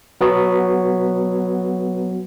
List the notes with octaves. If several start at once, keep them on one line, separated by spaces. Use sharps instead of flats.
F#3 B3 F#4